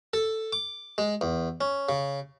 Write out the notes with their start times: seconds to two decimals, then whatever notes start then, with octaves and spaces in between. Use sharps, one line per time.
0.13 A4
0.53 D6
0.98 G#3
1.21 E2
1.61 C#4
1.89 C#3